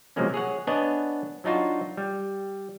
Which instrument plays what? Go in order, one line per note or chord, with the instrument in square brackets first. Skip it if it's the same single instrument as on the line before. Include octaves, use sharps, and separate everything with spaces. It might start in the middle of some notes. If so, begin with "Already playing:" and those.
[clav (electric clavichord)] C3 F3 F#3 G#3 A#3 C#4
G#4 C#5 F#5
B3 D4 C#5 D#5 F#5 G#5
F#3 D4 D#4 F4 F#4
G3